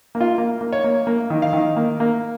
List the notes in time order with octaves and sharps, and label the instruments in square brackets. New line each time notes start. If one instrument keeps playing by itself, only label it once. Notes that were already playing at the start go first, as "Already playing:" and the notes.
[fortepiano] A#3
F4
A#3
A#3
C#5
A#3
A#3
D#3
F5
D#3
A#3
A#3